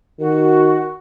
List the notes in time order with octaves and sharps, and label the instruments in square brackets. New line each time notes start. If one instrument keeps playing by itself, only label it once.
[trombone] D#3 [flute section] F#4